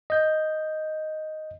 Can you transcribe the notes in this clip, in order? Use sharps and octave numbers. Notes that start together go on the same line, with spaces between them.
D#5 G6